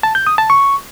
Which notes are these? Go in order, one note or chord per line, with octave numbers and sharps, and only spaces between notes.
A5
G6
D#6
A5
C#6